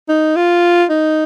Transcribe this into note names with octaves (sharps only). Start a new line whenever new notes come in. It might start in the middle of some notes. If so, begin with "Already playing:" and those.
D#4
F4
D#4